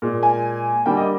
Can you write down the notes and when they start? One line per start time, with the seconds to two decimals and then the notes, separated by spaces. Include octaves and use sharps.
0.02 A#2 G#3
0.23 G#5
0.86 D3 G3 A#3 G5
0.97 D#5